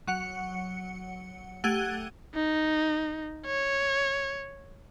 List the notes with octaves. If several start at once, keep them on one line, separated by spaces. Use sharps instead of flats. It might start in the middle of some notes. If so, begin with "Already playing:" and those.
F#3 F#5 C#7
A3 G4 F#5 F#6 G#6 D#7
D#4
C#5